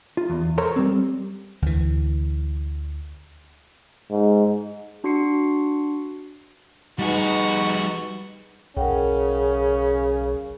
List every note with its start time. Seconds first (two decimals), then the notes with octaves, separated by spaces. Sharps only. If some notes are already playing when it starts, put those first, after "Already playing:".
0.17 F4
0.29 E2
0.58 A4 A#4 C5 C#5 A#5
0.76 G3 C4
1.62 D2 E3
4.11 G#2
5.04 D4 F#4 C6 C#6 C7 C#7
6.99 G3 D#4 F#4 G#4 B4
8.77 B1 C#3 C#4 A#4 F#5 G5